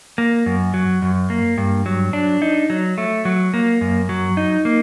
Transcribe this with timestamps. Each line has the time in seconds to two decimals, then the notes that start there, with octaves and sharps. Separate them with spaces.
0.18 A#3
0.46 F#2
0.74 F#3
1.02 F#2
1.30 A#3
1.58 G2
1.86 F#3
2.13 D4
2.42 D#4
2.70 F#3
2.98 A3
3.25 F#3
3.54 A#3
3.81 F#2
4.09 F#3
4.37 D#4
4.65 A#3